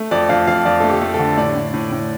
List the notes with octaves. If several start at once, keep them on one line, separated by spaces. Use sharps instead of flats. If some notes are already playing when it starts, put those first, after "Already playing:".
Already playing: A3
F2 D5
F2 F5
F2 F5
F2 D5
A3 A4
G4
A3
A4
D3
A2 D5
A2
A2
A2